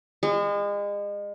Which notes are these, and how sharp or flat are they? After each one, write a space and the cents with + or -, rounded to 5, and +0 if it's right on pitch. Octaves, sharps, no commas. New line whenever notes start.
G#3 -35